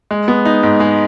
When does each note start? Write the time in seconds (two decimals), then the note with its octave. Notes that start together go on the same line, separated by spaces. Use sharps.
0.11 G#3
0.28 B3
0.45 D#4
0.63 G#2
0.80 G#3